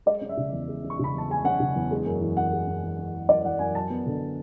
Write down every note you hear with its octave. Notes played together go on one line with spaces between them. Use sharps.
G#3 D5
C#4
E5
C#3
E2
G#3
C#4
C#6
C#3 B5
E2 A5
G#3 G#5
C#4 F#5
C#3
E2
G#3
F#2
E3
F#2 F#5
G#3
F#2
E3
F#2
G#3
F#2 D5
E3 F#5
F#2 G#5
F#3 A5
B3
D3